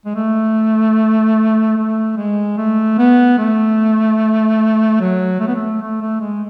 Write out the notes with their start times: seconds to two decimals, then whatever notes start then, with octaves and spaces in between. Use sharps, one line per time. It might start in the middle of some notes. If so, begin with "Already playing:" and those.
0.06 G#3
0.15 A3
1.77 A3
2.17 G#3
2.58 A3
2.98 B3
3.38 A3
5.00 F#3
5.40 A3
5.47 B3
5.55 A3
5.81 A3
6.01 A3
6.20 G#3